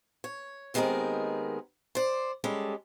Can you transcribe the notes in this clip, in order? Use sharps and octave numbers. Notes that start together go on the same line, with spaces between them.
C#5
D#2 D#3 G#3 B3 C4 A#4
C5 D5
G3 G#3 C#4 A4